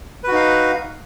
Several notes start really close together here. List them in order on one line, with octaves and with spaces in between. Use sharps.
B4 F#4 D#4 F5